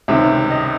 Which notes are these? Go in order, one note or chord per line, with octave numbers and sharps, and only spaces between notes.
C#2 C3 D#3 E5
D#5